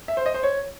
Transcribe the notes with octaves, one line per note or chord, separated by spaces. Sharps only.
E5
C5
D#5
C5
C#5